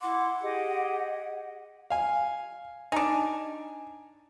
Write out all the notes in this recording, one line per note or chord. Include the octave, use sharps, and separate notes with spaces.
E4 F#5 C6 D6
G4 G#4 D#5
F5 G#5
D4 D#4 G#5